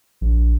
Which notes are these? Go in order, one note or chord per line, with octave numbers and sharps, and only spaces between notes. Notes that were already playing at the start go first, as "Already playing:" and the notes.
A#1